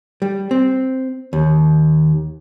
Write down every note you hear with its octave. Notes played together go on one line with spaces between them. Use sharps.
G3
C4
D#2